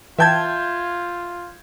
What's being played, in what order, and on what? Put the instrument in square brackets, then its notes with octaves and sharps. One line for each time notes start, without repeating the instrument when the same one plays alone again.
[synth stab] E3 G5 A5 [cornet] F4 [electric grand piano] E5 G6 G#6